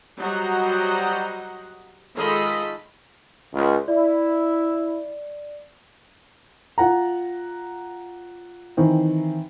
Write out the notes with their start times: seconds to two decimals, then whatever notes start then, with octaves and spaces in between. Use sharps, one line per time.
0.19 F#3 G3 C5 D#5 F#5 A#5
2.17 D#3 G#3 F4 A4 D#5 B5
3.53 C#2
3.88 E4 D5
6.78 F4 F#5 A#5
8.77 D#3 E3 C4